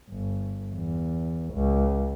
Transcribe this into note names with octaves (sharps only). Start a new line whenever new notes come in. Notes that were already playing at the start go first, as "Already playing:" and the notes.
G1
E2
C#2